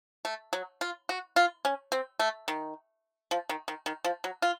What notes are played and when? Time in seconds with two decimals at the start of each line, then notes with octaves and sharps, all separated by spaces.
0.25 A3
0.53 F#3
0.81 F4
1.09 F#4
1.36 F4
1.65 C#4
1.92 C4
2.19 A3
2.48 D#3
3.31 F3
3.49 D#3
3.68 D#3
3.86 D#3
4.04 F3
4.24 F#3
4.42 F4